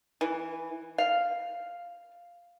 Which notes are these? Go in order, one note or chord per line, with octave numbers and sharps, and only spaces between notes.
E3
F5